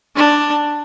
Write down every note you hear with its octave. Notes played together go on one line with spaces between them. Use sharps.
D4